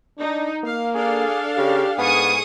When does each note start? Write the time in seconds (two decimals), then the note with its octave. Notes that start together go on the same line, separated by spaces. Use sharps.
0.18 D4 D#4
0.64 A#3 F5
0.94 D4 G#4 A4 F5
1.57 C#3 G4
1.98 G#2 B3 G#4 C#6 D#6